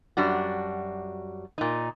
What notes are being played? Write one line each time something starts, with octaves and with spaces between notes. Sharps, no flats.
F#2 G3 D4 F#4
A#2 D#4